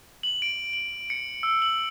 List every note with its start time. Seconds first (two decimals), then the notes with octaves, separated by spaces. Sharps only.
0.23 F#7
0.42 D7
0.73 F#7
1.10 C#7
1.43 E6
1.62 F#7